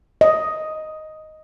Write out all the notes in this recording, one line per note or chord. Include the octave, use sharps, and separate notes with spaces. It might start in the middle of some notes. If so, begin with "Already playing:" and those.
D#5